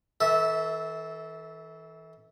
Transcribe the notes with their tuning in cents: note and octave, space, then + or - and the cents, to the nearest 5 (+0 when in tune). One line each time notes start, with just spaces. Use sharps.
E3 -35 A4 +0 E5 -15